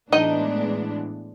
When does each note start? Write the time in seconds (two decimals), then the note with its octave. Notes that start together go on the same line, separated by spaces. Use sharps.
0.12 A2 E3 G#3 B3 D4 D#4 D#5